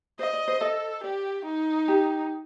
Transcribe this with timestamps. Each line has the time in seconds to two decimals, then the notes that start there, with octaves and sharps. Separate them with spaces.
0.19 C5 D#5
0.33 D5
0.48 C5
0.61 A4 D#5
1.04 G4 D5
1.45 D#4
1.88 G4